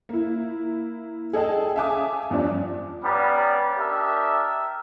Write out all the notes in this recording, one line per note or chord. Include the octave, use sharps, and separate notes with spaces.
A#3 E4
G#4 A4 D#5 G5 A5
E5 F5 G#5 A5 D6 D#6
E2 G2 F3 D4
G3 B3 C#4 D5 A#5
D4 G4 A#4 D#5 E5